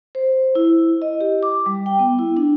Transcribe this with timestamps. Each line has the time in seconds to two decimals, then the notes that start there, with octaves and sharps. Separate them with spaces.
0.15 C5
0.55 E4
1.02 D#5
1.20 G4
1.43 D6
1.66 G3
1.86 G5
1.99 B3
2.19 E4
2.37 D4